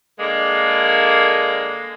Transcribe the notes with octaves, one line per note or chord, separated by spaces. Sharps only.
D3 G#3 A#3